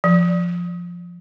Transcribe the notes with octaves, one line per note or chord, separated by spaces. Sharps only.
F3